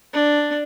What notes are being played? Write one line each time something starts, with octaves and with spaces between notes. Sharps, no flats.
D4